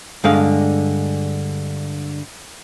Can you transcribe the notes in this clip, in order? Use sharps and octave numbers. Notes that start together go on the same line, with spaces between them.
G2 D3 G#3 G#4 F5